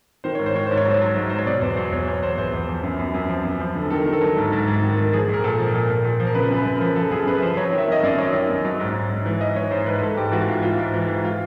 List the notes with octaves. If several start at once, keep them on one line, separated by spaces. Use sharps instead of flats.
D#3 C5
G#2 C#5
C5
D#3 C#5
G#2 C5
C#5
F#3 C5
F#3
G#2
F#3 C5
C#5
B2 D5
E2 C5
F#3 C5
E2 C#5
E2 C#5
E2 C5
E2 C5
E2
F3
F#2
F#2
F#2
F3
F#2
F3
D3
D#3 A4
D#3 A#4
A4
F#3
G#2
G#2
G#2
D#3
D#3
F3 G#4
A#2
A#4
A#2 A4
F3
A#2
A#2
A#2
F3
A#4
C#3 B4
F#2
B4
F#2
A#4
F3
F3 A4
F#2 G#4
F#2 B4
F3 C5
F#3 C#5
D#3
E5
D#3 D#5
F#2 D5
F#3 C#5
D#3
F#2
F#3
G#2
G#2
G#2
E3
G#2 D#5
E3 C#5
G#2 C5
G#2 B4
G#2 A4
G#2 G4
E3 F#4
G#2 F4
E3 F4
G#2
E3
G#2
F4